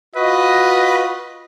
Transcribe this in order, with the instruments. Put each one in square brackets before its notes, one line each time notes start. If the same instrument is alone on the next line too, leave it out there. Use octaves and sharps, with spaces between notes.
[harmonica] F4 [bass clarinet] F#4 [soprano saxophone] B4 [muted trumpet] D#5